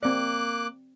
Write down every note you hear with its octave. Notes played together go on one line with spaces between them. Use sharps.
A#3 C4 D5 D6 F#6